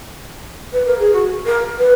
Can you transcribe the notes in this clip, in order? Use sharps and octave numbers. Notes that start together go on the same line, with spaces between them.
B4
A#4
G#4
F#4
A#4
B4